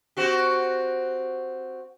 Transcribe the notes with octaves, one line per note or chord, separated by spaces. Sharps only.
C4 F#4 G4